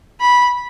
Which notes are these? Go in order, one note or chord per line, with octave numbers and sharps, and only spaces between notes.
B5